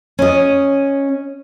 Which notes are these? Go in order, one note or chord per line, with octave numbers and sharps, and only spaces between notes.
C#4 D#5